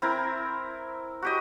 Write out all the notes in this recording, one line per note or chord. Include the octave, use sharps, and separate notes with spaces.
C4 E4 A#4
F#4 G4 D#5